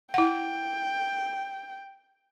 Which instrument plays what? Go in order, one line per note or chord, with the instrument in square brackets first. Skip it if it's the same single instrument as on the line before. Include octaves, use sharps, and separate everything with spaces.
[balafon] E4 F#5 [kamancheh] G5